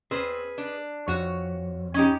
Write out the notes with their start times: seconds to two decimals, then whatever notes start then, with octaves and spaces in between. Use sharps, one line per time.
0.11 C4 G#4 B4
0.58 D4
1.08 F2 F#4 C#5
1.94 C#4 D#4 G4